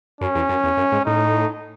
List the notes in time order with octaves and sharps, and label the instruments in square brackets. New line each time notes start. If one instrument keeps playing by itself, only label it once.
[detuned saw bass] F#2 [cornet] C#4
[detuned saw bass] E2
F#2
E2
F#2
G#2
[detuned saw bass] A2 [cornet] D#4